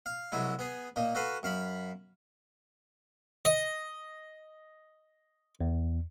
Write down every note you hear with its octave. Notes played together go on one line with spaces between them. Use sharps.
F5
C2 F#3 G#3 E4
B3 G#4
A#2 A#3 D#4
F#4 A4 B4 F5
F#2 F5 B5
D#5
E2